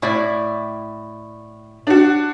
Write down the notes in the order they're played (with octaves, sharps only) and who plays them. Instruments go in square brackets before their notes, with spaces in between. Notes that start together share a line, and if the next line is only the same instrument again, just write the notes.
[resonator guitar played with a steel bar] A2 E4 D5
[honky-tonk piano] D4 F#4